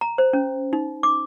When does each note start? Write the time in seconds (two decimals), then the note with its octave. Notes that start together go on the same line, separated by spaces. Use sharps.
0.01 A#5
0.18 C5
0.33 C#4
0.73 D#4
1.03 D6